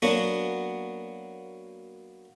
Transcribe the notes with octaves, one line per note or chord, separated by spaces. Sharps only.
F#3 A#3 B3 D4 F#4